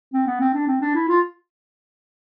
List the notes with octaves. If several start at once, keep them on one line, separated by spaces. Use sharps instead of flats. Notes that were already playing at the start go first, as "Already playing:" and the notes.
C4
B3
C4
D4
C4
D4
E4
F4